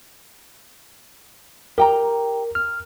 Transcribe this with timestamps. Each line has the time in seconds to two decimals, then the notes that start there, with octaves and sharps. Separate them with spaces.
1.78 G4 A#4 G5 A#5
2.55 F6